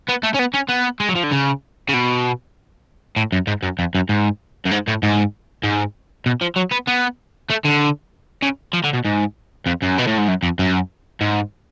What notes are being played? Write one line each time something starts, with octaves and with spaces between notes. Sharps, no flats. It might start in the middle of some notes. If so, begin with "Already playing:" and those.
B3
A3
C#4
B3
C#4
B3
G#3
F#3
F3
D3
C#3
C#3
B2
A2
F#2
G#2
F#2
F2
F#2
G#2
F#2
G#2
A2
G#2
G#2
B2
F3
F#3
B3
B3
A3
D3
C#3
F3
D3
B2
G#2
F2
F#2
B2
A2
G#2
F#2
F2
F#2
G#2